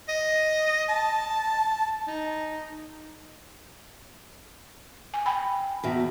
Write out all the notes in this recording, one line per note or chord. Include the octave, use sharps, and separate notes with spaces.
D#5
A5
D#4
G#5
G5 B5
E2 B2